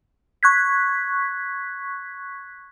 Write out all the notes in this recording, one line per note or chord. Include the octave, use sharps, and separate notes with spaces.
C#6 F#6 G#6 B6